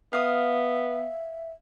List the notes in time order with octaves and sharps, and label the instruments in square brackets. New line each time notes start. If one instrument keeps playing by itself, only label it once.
[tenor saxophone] B3 [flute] E5 [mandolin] F5 D#6